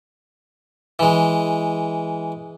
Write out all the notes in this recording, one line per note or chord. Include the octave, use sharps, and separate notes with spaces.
E3 G#3